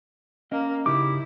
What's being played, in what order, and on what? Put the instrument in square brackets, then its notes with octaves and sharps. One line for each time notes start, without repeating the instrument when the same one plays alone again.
[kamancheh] A#3 [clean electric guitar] C#4 A#4 D#5
[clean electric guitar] C#3 D#4 G4 [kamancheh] E4 [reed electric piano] D6